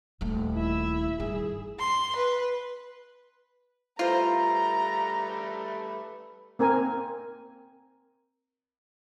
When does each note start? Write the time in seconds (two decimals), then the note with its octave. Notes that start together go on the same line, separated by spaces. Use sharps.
0.21 D#1 A3
0.53 E4 E5
1.20 G2 D#3 G#4
1.79 C6
2.16 B4
3.99 G3 A3 F4 B4 C5 A#5
6.59 A#3 C4 A#4 G#5